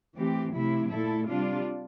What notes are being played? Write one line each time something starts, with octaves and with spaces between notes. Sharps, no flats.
E3 A3 C4 G4
C3 F3 A3 E4
A#2 A3 E4 A4
C3 G3 D4 F4